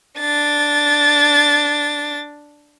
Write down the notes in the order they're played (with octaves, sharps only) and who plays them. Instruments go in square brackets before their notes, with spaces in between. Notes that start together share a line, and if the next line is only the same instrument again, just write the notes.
[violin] D4 A6